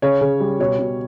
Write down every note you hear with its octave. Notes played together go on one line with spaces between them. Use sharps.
C#3 C#5
C#3
G3
B2 C#5
B2